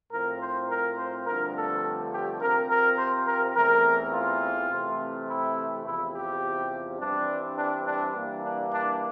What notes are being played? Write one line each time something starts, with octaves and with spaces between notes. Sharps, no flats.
A2 F3 C4 A#4
C5
A#4
C5
G2 D3 F3 A3 C4 A#4
A4
G4
C3 F3 C4 A#4
A#4
C5
A#4
E2 E3 A3 C4 A#4
F4
C3 E3 A3 C4
E4
E2 C3 F3 E4
G4
G2 E3 G3 C4 D4
D4
D4
G2 E3 G3 A#3
D4
D4